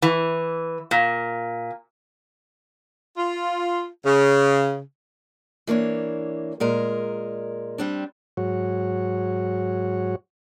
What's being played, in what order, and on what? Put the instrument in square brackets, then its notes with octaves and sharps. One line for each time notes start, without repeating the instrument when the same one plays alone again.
[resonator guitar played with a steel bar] E3
A#2
[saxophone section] F4
C#3
[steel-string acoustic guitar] E3 A#3 D4 C#5
A#2 G#3 A#4
G3 C4 D4
[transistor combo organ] G#2 F#3 F#4 C#5